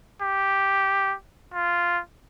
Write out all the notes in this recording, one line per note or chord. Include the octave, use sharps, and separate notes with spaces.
G4
F4